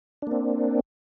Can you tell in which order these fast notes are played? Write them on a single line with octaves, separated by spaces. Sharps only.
D4 A#3 C4